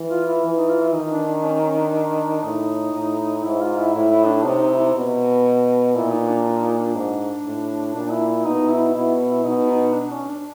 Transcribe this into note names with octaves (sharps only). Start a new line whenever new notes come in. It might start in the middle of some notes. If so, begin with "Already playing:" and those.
Already playing: E3
F4
E4
E3
D#4
F4
E4
D#3 D#4
D4
D4
C#4
C#4
D4
A2 D#4
A2
G#2 E4
F4
E4
A2 E4
E4
D4
C3 D#4
D#4
E4
B2
A#2 E4
D#4
D4
D4
D#4
D4
G#2
A2
A#2 D4
E4
E4
B2 D#4
E4
B2 E4
E4
B2 D#4
D#4
D4
C#4
D4